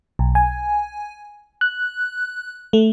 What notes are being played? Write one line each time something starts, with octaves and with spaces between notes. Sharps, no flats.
B1
G#5
F#6
A3